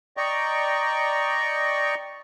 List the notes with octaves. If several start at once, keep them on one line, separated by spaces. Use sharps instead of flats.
D5 D#5 G5 A#5 C#6